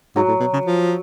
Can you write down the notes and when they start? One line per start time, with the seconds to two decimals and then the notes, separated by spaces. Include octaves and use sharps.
0.16 G#2 F#3
0.28 A2
0.40 B2
0.53 C#3
0.66 F3